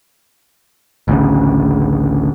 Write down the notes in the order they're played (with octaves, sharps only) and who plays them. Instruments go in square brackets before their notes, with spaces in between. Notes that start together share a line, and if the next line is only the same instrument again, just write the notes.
[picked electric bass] A1 D2 C#3